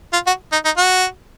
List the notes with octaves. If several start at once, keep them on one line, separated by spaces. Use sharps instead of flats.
F4
F#4
D#4
D#4
F#4